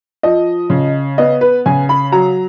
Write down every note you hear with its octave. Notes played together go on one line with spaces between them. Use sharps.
F3 D#5
C#3
B3 D#5
B4
C#3 G#5
B5
F#3 A#5